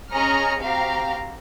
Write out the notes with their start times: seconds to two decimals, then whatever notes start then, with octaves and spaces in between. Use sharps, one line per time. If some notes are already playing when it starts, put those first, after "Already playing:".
0.13 C#4 G#4 D#5 A#5 F6 C#7
0.61 C4 F#4 G4 F5 A#5